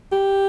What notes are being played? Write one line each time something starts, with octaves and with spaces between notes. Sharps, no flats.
G4